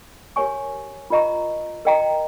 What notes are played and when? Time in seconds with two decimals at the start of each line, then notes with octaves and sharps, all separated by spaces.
0.36 G4 A#4 C#5 G#5 C#6
1.10 F4 A#4 D#5 A#5 C#6
1.85 A#4 D#5 G5 A#5